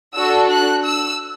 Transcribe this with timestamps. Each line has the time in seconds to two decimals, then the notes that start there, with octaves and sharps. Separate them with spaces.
0.15 D4 F#4 A4 E6
0.50 F#6
0.85 E6